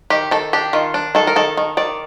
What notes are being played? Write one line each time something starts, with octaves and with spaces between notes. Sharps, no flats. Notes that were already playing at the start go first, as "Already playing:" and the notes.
D#3 G4
D#3 A4
D4 G4
D#3 F4
D4
D#3 A4
A#4
D#3 A4
D#3
D#3 D5